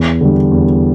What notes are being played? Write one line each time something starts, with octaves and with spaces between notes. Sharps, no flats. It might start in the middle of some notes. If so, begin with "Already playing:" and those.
Already playing: E2
D3 G3
E2